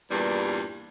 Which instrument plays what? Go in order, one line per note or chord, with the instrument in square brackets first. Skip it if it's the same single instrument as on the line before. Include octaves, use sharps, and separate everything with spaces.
[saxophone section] E2 G2 A#2 G3